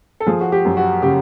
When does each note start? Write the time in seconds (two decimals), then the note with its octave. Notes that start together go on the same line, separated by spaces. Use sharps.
0.20 A4
0.27 F3 G#4
0.41 F#4
0.52 G4
0.65 F#2
0.77 F#4
1.02 C#3 G4